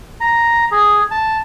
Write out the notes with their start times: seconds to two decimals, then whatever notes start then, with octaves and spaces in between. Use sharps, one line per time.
0.20 A#5
0.71 G#4
1.11 A5